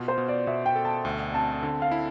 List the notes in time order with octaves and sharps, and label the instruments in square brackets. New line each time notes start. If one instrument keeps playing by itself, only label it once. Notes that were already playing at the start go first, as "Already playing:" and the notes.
Already playing: [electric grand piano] B2 F4
[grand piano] C5
[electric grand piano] B2
[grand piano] D5
[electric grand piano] B2 [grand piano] E5
[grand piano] G5
[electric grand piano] A4
[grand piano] A5
[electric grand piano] D2
[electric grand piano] C4 [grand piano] A5
[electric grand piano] D3
[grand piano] F5
[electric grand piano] E4